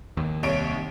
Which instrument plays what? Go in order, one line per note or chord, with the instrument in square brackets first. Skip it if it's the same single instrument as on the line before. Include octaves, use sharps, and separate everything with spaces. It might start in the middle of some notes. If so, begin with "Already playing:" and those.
[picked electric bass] D#2 D#3
[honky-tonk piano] C2 C#5 D7